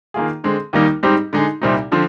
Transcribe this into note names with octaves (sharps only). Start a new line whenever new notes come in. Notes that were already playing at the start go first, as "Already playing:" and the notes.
D#3 A#3 F4 G#4
D3 G#3 C4
D#2 D#3 G3 A#3 D#4
G#2 G3 C4 D#4 G4
D3 G#3 D#4 G#4
C2 A#2 G3 C4 D#4
D3 F3 C4